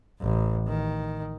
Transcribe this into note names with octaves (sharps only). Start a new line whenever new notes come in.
A1
D#3